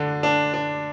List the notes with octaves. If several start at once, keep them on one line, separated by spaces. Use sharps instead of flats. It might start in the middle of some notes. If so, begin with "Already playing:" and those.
Already playing: D3 D4
D4
D4